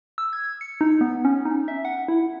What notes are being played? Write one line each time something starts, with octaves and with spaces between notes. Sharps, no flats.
E6
G#6
C#7
D#4
B3
C#4
D#4
E5
F#5
E4